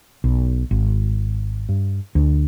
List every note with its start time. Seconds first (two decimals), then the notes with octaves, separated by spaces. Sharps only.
0.24 B1
0.71 G#1
1.69 G2
2.15 D2